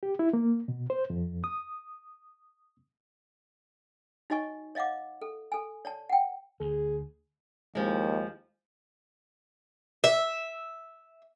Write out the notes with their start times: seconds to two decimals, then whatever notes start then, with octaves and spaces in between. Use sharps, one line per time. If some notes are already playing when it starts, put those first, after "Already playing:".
0.03 G4
0.19 E4
0.33 A#3
0.68 B2
0.90 C5
1.10 F2
1.44 D#6
4.30 D#4 F#4 C#5 D#5 G#5 C#6
4.75 C#5 D#5 F5 F#5 D6
5.22 A4
5.52 A4 G#5
5.85 C#5 D5 A5
6.10 F#5 G5
6.60 D2 G#4
7.75 D#2 F3 G#3
10.04 E5